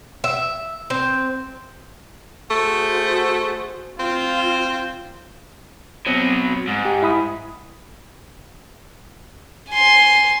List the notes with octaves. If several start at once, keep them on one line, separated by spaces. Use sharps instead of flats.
E5
C4
A3 F#4 G#4 C5
C4 F4
B2 F#3 C4
G#2
G4
E4 B5 D#6
G#5 C6